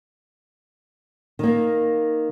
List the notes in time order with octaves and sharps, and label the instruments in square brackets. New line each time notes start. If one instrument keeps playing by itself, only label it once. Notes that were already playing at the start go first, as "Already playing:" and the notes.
[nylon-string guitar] D#3 A#3